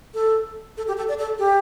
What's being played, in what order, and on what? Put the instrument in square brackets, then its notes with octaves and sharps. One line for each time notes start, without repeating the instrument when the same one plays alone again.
[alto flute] A4
A4
G4
A4
D5
A4
G4